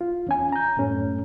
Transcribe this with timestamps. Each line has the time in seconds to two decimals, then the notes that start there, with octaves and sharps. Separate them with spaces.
0.01 F4
0.27 E2 C#4 G#5
0.53 A#5 G6
0.77 F#2 A2 A3 C#4